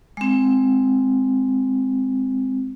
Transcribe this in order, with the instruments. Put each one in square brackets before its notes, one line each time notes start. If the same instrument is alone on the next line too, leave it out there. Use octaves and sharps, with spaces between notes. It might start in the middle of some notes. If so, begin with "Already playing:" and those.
[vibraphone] G#3 C4